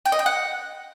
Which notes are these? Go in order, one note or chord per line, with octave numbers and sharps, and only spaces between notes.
G5
D#5
G5
F#5